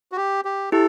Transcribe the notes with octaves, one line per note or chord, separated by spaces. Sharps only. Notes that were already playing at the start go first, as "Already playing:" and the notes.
F#4
G4
G4
E4 G4 A4